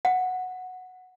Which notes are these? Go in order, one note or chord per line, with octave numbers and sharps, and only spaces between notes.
F#5